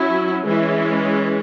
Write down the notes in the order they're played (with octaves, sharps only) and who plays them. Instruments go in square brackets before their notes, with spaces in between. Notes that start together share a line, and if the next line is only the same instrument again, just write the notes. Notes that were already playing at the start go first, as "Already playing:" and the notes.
Already playing: [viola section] F#3 C#4 E4
E3 G#3 C#4 E4